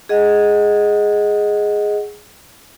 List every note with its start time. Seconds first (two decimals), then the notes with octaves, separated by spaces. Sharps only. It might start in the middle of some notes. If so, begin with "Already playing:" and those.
0.09 G#4 D#5 F#5